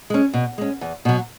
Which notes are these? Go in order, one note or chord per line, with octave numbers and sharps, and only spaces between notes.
G#3 C#4
B2
G#3 C#4
E2
B2 F#3